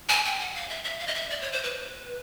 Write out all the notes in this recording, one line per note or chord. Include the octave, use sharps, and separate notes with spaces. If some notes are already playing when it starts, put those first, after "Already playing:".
G#5
G5
F#5
F5
E5
E5
F5
D#5
E5
D5
C#5
C5
B4